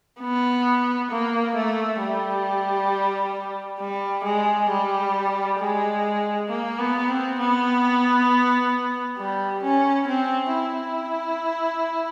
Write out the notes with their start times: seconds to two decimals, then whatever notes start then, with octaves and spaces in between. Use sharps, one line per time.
0.21 B3
1.11 A#3
1.55 A3
2.00 G3
3.80 G3
4.24 G#3
4.70 G3
5.59 G#3
6.49 A#3
6.79 B3
7.08 C4
7.39 B3
9.18 G3
9.63 C#4
10.08 C4
10.52 E4